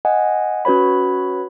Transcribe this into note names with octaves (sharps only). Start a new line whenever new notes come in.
D#5 F#5 G#5
C#4 F#4 B4 C#5 B5